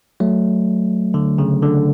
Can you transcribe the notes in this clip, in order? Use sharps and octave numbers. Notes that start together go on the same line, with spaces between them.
F#3 A3
D3
C#3
D3